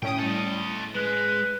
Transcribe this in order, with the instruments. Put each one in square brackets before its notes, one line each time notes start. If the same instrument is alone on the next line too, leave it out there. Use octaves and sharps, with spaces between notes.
[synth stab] A2 C#4 D#6 [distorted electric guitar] G5
[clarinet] G3 [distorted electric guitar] A4 D#5
[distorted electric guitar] G#3 [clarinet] B4